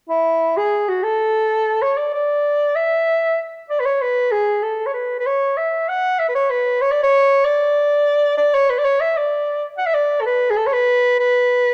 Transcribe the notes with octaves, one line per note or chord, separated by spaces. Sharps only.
E4
G#4
F#4
A4
C#5
D5
D5
E5
D5
B4
C#5
B4
G#4
A4
C#5
B4
B4
C#5
E5
F#5
E5
B4
C#5
B4
C#5
D5
C#5
D5
D5
C#5
B4
D5
C#5
E5
D5
F#5
E5
D5
A4
B4
G#4
A4
C#5
B4
B4